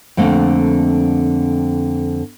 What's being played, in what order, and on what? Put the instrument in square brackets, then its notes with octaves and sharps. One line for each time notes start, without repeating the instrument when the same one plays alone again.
[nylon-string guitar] F2 D3 A3 A#3 C4